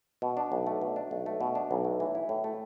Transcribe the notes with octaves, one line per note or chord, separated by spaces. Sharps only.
B2
D4
B1
A3
B2
D4
B1
A3
B2
D4
B1
A3
E3
E4
A2
A3